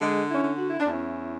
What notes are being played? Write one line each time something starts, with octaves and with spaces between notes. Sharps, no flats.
D3 G#3
C#4 E4
D3
F#4
E4
D4
E2 C#4 E4